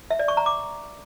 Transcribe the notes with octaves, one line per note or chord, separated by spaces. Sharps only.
E5
D5
C#6
A#5
D6